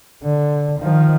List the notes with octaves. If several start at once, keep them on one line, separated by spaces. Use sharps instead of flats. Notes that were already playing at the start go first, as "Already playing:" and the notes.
D3
D#3 F3